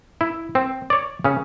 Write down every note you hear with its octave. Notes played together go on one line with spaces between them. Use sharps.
E4
C4
C#5 D5
C#3 C#4